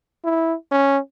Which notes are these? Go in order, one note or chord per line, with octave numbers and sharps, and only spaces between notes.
E4
C#4